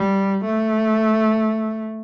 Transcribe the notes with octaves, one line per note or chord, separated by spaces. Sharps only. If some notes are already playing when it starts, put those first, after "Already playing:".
Already playing: G3
A3